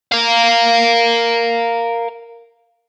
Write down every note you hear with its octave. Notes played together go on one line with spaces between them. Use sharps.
A#4 F5